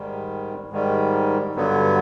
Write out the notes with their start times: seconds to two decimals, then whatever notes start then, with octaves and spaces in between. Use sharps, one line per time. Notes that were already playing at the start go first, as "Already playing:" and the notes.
Already playing: G#2 D#3 G3
0.71 G#2 D#3 G3
1.55 G2 D3 F#3 B3